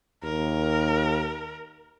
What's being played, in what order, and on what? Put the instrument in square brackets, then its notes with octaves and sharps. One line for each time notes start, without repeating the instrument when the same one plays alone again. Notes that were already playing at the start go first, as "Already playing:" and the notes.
[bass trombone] D#2 [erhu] A#4